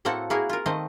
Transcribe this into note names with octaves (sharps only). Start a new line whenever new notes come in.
A2 A#3 C4 F#4 A4 F#5
A#3 E4 F#4 G#4 A#4
F4 A#4
D#3 A3 C4 D#5